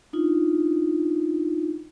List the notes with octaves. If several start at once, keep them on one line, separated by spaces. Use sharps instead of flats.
D4 D#4 F4